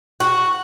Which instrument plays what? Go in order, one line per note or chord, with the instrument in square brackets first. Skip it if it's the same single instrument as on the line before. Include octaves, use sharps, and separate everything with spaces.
[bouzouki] F#4